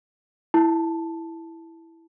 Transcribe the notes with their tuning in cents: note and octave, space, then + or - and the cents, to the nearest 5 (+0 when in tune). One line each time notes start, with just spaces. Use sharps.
E4 +0 A5 +0